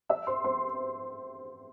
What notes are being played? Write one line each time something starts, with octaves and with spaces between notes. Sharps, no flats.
E5 E6
C5 C6
C5 C6